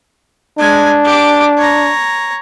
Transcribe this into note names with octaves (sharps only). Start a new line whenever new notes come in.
G#3 D4 G#5
G4 D6
C#5 A#5